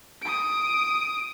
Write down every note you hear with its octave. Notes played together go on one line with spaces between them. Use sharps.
D#6 D7